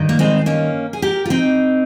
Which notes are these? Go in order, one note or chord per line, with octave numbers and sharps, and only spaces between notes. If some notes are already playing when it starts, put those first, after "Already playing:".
Already playing: G2 D#3
A#3
G#3 C4
A#3 C#4
G#4
G4 A#4
F4
C4 D#4